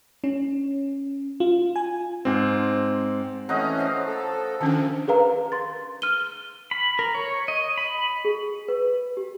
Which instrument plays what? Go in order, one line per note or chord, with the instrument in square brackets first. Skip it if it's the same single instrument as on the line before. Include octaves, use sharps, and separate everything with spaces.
[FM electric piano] C#4
F4
G#5
[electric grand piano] G#2 C4
[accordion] E3 A3 C#4 [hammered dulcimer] C4 [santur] D#5 F#5 A#5
[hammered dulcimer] F3 F5
[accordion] A4
[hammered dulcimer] C3 [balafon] D#3 C#4 D4 [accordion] F3
[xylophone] G#4 A#4 B4 F5 A#5
C6 A6
F6 D#7 G7
[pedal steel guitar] B5
A#4
C#5
D#5
B5
[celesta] G#4
B4
G4